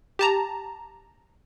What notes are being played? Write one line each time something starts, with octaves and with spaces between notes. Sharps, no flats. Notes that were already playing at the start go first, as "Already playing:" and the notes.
G4 A5 A#5